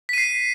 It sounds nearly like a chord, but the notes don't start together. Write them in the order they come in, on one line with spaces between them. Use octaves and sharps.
B6 D#7 C7